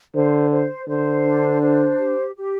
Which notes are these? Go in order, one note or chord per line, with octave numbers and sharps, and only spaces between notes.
D3 C5
C5
D3 C5
D4
C5
G4
G4